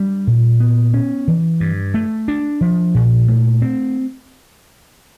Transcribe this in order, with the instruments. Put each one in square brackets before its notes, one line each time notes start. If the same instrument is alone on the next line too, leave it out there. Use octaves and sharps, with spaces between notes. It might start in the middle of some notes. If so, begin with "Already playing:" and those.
Already playing: [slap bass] G3 D4
A#2
B3
C#4
E3
G2
A3
D4
F3
A#2
A3
C4